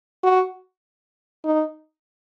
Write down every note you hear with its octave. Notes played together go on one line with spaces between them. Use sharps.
F#4
D#4